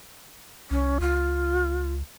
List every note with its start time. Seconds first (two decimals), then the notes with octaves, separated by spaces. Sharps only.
0.71 C2 C#4
1.01 C#2 F4